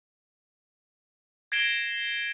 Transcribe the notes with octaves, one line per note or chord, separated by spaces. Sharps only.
G#6 A#6 C7 D7 E7 G7